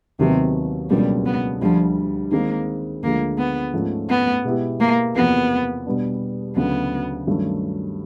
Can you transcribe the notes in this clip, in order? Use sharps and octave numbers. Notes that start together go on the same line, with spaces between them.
D#2 C3 D#3 F#3 B3
C#2 B2 F#3 G3 A#3 D4
B3
D2 D3 F3 G3
D#3 G#3 A#3 C4 D#4
D2 D3 F3 G#3 A#3
B3
G#2 F3 A3 C#4 F4
B3
B2 G#3 B3 E4 G4
A#3
E2 C3 F3 A#3 B3
B2 G3 B3 D4
D2 C#3 F#3 B3
G2 D#3 F#3 A3 C#4